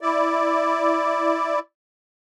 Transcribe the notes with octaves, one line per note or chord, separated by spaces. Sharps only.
E4 D5